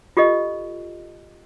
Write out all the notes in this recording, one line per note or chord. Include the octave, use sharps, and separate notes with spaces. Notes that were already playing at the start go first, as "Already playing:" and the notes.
F4 G4 A4 D#5